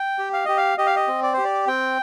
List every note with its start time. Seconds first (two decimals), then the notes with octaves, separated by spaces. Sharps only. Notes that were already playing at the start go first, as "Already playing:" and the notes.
Already playing: G5
0.18 G4
0.33 F5
0.45 G4 D#5
0.57 F5
0.78 G4 D#5
0.86 F5
0.96 D#5
1.08 C4
1.23 D5
1.33 G4 C5
1.44 D5
1.67 C4 G5